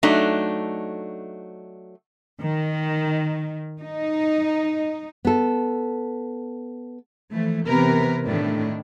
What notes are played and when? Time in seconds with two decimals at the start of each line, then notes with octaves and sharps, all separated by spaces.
0.03 F#3 A3 D4 D#4
2.41 D#3
3.80 D#4
5.25 B3 A4
7.31 E3 F3 A3
7.67 C3 E3 B3 A#4 B4
8.26 A2 D#3 D4